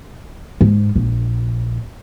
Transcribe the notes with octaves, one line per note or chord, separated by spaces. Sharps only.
G#2
A#1